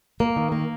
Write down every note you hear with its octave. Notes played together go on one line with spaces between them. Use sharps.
A#3
D#3
A#3